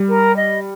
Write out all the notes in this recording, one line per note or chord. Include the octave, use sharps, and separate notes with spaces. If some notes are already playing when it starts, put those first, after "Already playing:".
Already playing: G3
A#4
D#5